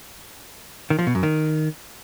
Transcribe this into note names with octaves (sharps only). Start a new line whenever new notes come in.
D#3
F3
B2
F#2
D#3